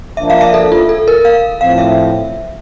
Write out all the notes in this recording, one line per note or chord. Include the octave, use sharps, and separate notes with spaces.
F3 A#3 D4 E5
F5
E5
A4
F4
A4
A#4
F5
A2 F3 C4 F5
E5